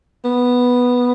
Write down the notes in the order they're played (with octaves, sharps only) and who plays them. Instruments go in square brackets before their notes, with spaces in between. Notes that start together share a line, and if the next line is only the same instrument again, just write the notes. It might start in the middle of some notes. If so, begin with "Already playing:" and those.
[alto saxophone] B3